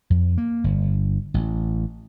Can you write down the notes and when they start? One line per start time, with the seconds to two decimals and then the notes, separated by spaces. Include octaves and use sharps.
0.10 F2
0.38 A#3
0.64 G1
1.34 A1